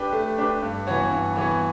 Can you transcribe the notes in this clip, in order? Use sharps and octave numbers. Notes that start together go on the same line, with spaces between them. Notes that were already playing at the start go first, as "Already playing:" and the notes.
Already playing: D4 G4 B4
A3
D4 G4 B4
G2
E3 B3 F#4 C#5
G2
E3 B3 F#4 C#5